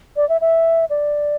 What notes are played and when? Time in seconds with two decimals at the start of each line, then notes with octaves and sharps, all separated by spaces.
0.16 D5
0.29 E5
0.41 E5
0.90 D5